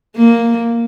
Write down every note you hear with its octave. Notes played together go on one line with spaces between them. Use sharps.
A#3